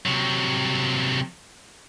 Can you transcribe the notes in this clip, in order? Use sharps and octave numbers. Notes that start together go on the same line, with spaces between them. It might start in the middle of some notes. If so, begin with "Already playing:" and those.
C3 F#3